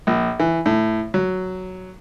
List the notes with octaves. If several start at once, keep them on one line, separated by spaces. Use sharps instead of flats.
A#1
E3
A2
F#3